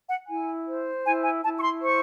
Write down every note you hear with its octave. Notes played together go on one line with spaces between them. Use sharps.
F#5
E4 G#5
C5
E4 G#5
G#5
E4 A5
C#6
C6
C5 C#6